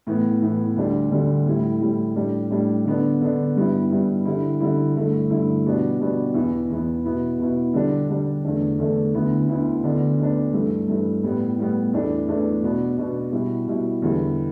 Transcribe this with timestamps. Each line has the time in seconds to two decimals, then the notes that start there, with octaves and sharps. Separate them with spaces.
0.07 A2 E3 B3
0.42 A2 E3 B3
0.76 D2 D3 G3 D4
1.11 D2 D3 G3 D4
1.46 A2 G3 E4
1.81 A2 G3 E4
2.16 A2 G3 D4
2.51 A2 G3 D4
2.85 D3 B3 D4
3.21 D3 B3 D4
3.56 G2 G3 B3 E4
3.91 G2 G3 B3 E4
4.25 D3 G3 E4
4.60 D3 G3 E4
4.95 G2 D3 A3 E4
5.30 G2 D3 A3 E4
5.66 B2 G3 B3 D4
6.00 B2 G3 B3 D4
6.34 E2 E3 B3
6.69 E2 E3 B3
7.05 B2 B3 E4
7.39 B2 B3 E4
7.74 D3 G3 D4
8.09 D3 G3 D4
8.44 E2 D3 A3 D4
8.78 E2 D3 A3 D4
9.14 D2 D3 B3 E4
9.49 D2 D3 B3 E4
9.83 D2 D3 B3 D4
10.19 D2 D3 B3 D4
10.53 G2 E3 A3
10.88 G2 E3 A3
11.23 A2 G3 B3
11.58 A2 G3 B3
11.92 E2 E3 A3 D4
12.28 E2 E3 A3 D4
12.63 B2 B3 D4
12.98 B2 B3 D4
13.32 B2 G3 E4
13.67 B2 G3 E4
14.02 E2 D3 G3 E4